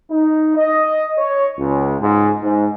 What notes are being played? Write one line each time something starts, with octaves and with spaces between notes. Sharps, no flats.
D#4
D#5
C#5
C#2
G#2
G#2